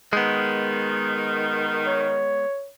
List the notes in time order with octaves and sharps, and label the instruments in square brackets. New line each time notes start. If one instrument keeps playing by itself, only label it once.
[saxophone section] D#3 [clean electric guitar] G#3 B3
[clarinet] C#5